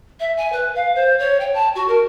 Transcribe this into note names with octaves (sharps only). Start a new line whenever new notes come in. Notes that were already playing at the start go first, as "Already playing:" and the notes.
E5
G#5
B4
F5
C5
C#5
G5
A5
F#4
A#4